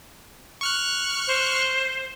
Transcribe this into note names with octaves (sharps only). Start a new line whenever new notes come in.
C#6 F6 F#6
C5